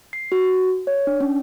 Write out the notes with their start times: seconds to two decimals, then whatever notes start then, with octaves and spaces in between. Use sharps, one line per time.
0.13 C7
0.32 F#4
0.87 C#5
1.07 D4
1.20 C#4